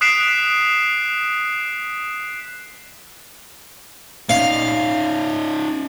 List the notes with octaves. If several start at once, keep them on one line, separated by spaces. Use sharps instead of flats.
D#6 F#6 B6 C7 D7 E7
C#4 D#4 F5